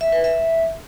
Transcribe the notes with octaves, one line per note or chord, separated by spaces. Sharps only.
E5
B4
E5